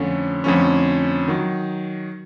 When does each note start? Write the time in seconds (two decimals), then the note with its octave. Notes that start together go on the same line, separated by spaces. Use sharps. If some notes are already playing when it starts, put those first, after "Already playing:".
Already playing: F2 D3 F3 A3 C#4
0.44 F2 D3 F3 A3 C#4
1.28 D#3 F#3